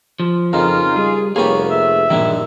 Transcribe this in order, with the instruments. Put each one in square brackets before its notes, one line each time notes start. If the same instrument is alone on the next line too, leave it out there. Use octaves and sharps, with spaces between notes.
[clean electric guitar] F3
[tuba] F2 [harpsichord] C#3 [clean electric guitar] D#4 A#4 [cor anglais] F4
[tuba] G3 [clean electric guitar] G#4
[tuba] F1 [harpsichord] A#3 G4 [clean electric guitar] G#4 B4 [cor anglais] C#5
[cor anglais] E5
[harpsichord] A#1 D#3 [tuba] G2 [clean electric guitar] E3 D4